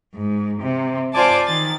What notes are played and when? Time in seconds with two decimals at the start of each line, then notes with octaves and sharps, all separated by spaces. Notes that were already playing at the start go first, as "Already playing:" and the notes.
0.15 G#2
0.62 C3
1.14 F4 C5 D5 G#5 A5 D6
1.47 D#3 A6